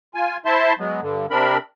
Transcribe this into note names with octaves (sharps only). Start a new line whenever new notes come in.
F4 G#5
E4 C5 E5 A5 C6
F#3 G#3 B3
G2 D3
C3 C4 D4 A#4 B5